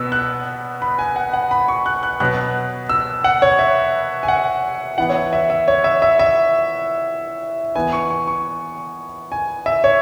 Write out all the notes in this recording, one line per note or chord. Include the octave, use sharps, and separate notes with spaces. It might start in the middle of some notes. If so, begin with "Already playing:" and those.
Already playing: B2 B3 E6
F#6
B5
G#5
F#5
F#5
B5
C#6
F#6
F#6
B2 F#3 B3 F#6
E6
F#5
C#5
E5
G#5
F#5
E3 B3 F#5
C#5
E5
E5
E5
C#5
E5
E5
E5
E3 B3 G#5
C#6
C#6
C#6
G#5
E5
C#5